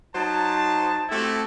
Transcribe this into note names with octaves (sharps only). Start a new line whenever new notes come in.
F#3 D#4 C5 A5
A3 C4 E4 F#4 G4 A4